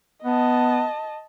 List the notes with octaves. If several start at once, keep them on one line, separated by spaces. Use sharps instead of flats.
B3 D#5 A5